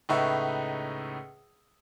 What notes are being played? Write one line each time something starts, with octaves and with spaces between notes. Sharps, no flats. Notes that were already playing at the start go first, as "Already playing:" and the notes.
C#2 A2 D#4 B4 E5 C#6